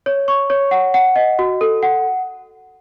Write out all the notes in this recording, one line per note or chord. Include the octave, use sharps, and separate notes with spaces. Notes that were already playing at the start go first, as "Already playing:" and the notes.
C#5
C#6
C#5
F#5
F#5
D#5
F#4
A4
F#5